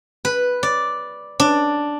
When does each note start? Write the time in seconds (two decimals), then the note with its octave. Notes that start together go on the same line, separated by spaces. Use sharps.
0.25 B4
0.63 D5
1.40 D4